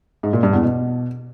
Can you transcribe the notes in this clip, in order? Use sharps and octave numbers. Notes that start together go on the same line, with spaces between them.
G#2
A#2
G2
E2
B2